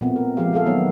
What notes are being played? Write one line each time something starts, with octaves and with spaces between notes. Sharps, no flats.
A#2 A3 B3 C4
A#4
F3 G#3 A#3 G4 G#4 F5
A3 G#4 A4 F5
D#3 F#3 A#3 B3 D#4 C#5